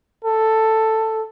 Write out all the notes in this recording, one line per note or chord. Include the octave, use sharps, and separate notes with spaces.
A4